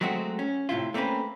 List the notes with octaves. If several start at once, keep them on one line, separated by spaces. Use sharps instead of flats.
F#3 G#3 A3 C4 F#4
C#4
A2 C3 E4 F4
A3 A#3 C4 C#4 B4